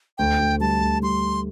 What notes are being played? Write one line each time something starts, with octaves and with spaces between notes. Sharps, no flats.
D2 G5
D2
G3 A5
D2
G3 C6